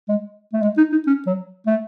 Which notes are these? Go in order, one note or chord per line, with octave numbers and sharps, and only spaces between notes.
G#3
A3
G#3
D#4
D#4
C#4
F#3
A3